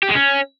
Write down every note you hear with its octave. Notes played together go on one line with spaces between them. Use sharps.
G4
G#3
C#4